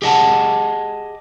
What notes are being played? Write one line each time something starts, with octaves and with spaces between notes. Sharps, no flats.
G4 G#4 D#5 F#5 A5